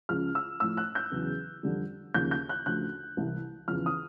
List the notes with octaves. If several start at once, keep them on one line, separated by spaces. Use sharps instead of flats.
C#2 C#3 F3 F6
E6
A2 F3 E6
F#6
G6
E2 C#3 F#3
F2 D3 G3
D#2 C#3 F3 G6
G6
F#6
D2 C#3 F3 F#6
C2 C3 E3 G3
E2 C#3 F3 F6
D#6